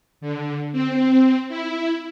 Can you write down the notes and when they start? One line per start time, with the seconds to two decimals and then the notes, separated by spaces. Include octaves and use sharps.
0.21 D3
0.72 C4
1.49 E4